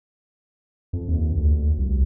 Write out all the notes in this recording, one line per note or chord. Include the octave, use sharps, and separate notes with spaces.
F2
D#2
D2
C2